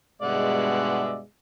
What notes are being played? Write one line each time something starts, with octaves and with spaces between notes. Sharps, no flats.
G2 B2 G#3 D5 E5 F#5